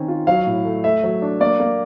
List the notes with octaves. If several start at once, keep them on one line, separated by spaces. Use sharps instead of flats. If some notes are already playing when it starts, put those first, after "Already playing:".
Already playing: D#3 C4 C#4
F4
F#3 F5
A2
A3
A3 E5
F#3
D4
A#3 D5
A#3